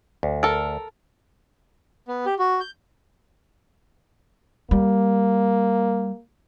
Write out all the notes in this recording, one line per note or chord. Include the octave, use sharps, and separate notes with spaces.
D2
A4 A#4
B3
G4
F#4
G6
G3 A#3